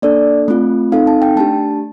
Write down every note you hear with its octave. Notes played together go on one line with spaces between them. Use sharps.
A#3 D4 A4 D5
A3 C4 F4
C4 D#4 A4 F5
A5
G5
A3 D4 G4 A5